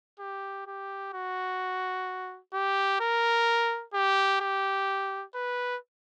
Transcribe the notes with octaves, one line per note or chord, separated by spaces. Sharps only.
G4
G4
F#4
G4
A#4
G4
G4
B4